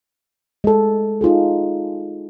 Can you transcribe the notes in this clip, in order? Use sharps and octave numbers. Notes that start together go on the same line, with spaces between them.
G#3 A4
D#4 F4 G#4 A4